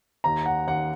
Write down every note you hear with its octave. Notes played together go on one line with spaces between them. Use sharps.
D#2 A#5
F#5
D#2 F#5